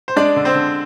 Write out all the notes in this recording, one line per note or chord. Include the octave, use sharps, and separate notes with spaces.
C5
G#3 D4 D5
D3
C4 C5
D3